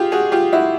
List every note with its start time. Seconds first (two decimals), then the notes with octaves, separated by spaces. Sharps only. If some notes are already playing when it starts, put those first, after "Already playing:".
Already playing: F4 G4 G#4
0.12 F#4 G#4
0.32 F4 G4
0.52 E4 F#4